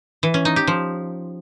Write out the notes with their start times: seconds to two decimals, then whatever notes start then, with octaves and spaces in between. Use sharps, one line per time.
0.23 E3
0.34 C#4
0.45 D#4
0.56 G4
0.67 F3